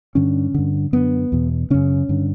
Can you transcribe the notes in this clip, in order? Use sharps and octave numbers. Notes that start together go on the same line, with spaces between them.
G2 D3 C#4
G2 D3
F#2 D3 B3
E2 B2
F#2 C#3 C#4
G2 D3